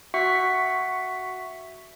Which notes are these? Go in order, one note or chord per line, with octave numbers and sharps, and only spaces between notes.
F#4 E5 F#5 C#6 B6